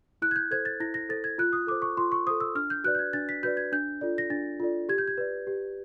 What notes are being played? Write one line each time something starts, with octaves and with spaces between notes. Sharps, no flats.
E4 F#6
G#6
G6
A4 C5 G#6
A6
E4 A#6
A#6
A4 C5 A6
G#6
F4 F#6
D#6
A4 C5 D6
C#6
F4 C6
C#6
A4 C5 D#6
E6
D4 F6
G6
F#4 B4 D5 F#6
G6
G#6
D4 A6
B6
F#4 B4 D5 G6
G#6
D4 G6
F4 A4 D5
A#6
D4 A6
F4 A4 D5
G4 G#6
G6
G#6
B4 D5
G4